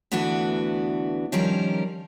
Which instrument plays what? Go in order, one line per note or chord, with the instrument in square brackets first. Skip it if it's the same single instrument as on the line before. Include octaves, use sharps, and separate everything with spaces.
[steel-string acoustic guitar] D2 E3 B3 D4 F#4
D#3 F3 G3 C#4 A#4